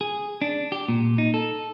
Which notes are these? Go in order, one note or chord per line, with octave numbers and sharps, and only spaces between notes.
G#4
D4
G4
A#2
D#4
A4